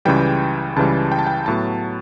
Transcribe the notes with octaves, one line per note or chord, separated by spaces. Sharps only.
C#2 C#3 E3 G3 G5
C#2 C#3 E3 G3 A5
G5
A5
G5
A2 F#3 B3 A5